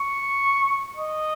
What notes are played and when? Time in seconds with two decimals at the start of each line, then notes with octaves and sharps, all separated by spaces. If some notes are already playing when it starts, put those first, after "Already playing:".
Already playing: C#6
0.96 D#5